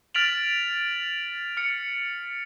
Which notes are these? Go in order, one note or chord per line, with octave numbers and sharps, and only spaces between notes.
F6 A6 B6 D7 F7 F#7
F6 C#7